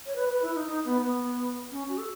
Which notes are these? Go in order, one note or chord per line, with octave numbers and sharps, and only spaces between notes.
C#5
B4
B4
E4
D#4
D#4
B3
B3
C#4
F#4
A4